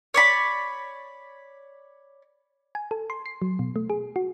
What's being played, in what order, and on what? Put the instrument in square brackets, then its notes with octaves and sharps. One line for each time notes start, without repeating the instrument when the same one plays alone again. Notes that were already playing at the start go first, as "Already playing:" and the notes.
[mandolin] C#5 D5 B5
[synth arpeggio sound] G#5
A4
C6
C7
F#3
B2
A3
G#4
F#4